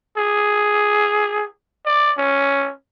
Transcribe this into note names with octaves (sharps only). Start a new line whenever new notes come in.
G#4
D5
C#4